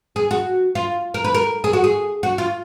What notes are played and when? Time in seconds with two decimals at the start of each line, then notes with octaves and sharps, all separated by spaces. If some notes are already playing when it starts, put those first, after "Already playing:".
0.16 G#4
0.31 F#4
0.75 F4
1.14 A#4
1.24 B4
1.35 A#4
1.64 G#4
1.73 F#4
1.84 G#4
2.23 F#4
2.38 F4